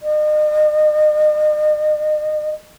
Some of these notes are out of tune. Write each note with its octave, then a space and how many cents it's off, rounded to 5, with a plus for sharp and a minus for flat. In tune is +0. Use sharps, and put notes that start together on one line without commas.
D#5 -40